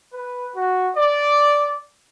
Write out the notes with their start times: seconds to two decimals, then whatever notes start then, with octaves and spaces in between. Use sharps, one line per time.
0.13 B4
0.53 F#4
0.95 D5